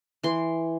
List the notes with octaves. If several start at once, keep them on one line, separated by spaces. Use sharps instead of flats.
E3 C6